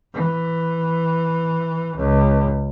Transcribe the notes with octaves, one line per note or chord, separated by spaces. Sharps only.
E3
C#2